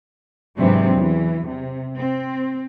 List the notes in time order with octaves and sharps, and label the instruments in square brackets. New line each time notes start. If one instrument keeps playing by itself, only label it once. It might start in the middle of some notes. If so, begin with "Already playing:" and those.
[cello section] G#2 C3 E3 F#3 C4 D4
E2 E3
C3
C4